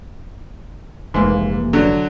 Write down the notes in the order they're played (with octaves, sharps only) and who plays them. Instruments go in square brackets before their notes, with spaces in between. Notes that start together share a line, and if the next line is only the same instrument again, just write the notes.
[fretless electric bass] F1 [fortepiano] G#2 [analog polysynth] E3 A#3
[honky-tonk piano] D3 [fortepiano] F#3